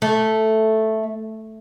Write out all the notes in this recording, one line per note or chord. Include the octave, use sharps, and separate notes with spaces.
A3